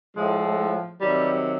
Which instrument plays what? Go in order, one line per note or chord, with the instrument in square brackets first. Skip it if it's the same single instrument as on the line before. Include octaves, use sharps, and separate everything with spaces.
[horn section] A2 F3 G#3
C3 D#3 F#3 G3